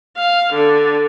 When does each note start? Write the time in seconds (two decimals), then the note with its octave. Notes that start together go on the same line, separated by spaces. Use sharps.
0.17 F5
0.53 D3